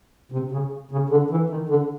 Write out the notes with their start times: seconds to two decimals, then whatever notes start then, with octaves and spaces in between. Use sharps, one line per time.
0.32 C3
0.52 C#3
0.91 C#3
1.10 D3
1.30 E3
1.49 D#3
1.69 D3